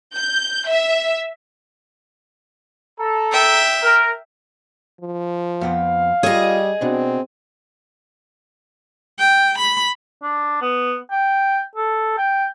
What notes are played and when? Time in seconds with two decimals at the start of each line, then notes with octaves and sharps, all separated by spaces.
0.16 G6
0.68 E5
3.00 A4 A#5
3.32 E5 G5
3.82 A#4
5.01 F3
5.61 F2 B3 C4 F5
6.23 G3 F4 G#4 A4 C#5 D#5
6.81 B2 C4 D4
9.19 G5
9.58 B5
10.23 D4
10.62 B3
11.11 G5
11.75 A4
12.18 G5